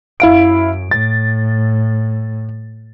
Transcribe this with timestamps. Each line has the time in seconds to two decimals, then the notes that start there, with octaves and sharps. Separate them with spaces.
0.20 F#2 E4 F5 D7
0.91 A2 A6